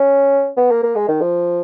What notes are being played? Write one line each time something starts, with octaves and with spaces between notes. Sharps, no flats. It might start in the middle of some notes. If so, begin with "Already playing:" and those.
Already playing: C#4
B3
A#3
A#3
G#3
D#3
F3